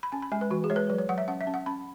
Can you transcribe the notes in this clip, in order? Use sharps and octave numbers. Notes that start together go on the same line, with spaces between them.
B5
C#4 G#5
B5
G#3 G#5
B4
E3 F#4
G#4
G#3 C#5
B4
F#3 B4
C#5
F#3 F#5
E5
C#4 F#5
E5
C#4
F#5
C#4 B5